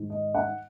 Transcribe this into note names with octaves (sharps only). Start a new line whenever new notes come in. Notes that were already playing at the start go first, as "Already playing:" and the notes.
Already playing: G#2 D#3
D#5
F#5